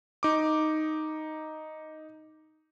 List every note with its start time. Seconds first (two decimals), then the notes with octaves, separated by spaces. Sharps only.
0.23 D#4 D6